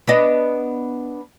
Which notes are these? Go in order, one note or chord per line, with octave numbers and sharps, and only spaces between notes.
B3 D4 D#5